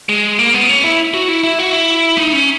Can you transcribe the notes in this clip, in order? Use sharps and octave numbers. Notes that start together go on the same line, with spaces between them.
G#3
A#3
B3
C#4
E4
F#4
E4
E4
F#4
E4
D#4
C#4